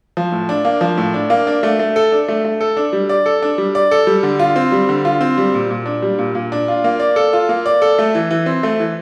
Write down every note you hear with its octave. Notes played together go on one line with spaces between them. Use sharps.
F3
A2
D4
A#3
F3
A2
D4
A#3
D4
A3
A3
A4
D4
A3
A3
A4
D4
G3
D5
A4
D4
G3
D5
A4
G3
D3
F4
C4
G3
D3
F4
C4
G3
A#2
A#2
D4
G3
A#2
A#2
D4
F4
A#3
D5
A4
F4
A#3
D5
A4
A3
E3
E3
C4
A3
E3